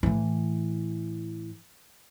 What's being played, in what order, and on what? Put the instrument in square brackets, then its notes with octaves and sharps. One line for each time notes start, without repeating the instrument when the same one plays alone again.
[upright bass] A2 E3